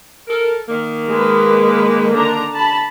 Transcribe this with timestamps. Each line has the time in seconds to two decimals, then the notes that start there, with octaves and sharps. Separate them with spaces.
0.28 A4 A#4
0.68 D#3 A#3
1.09 G#3 B4
2.14 D3 D4 A#5
2.53 A5 B5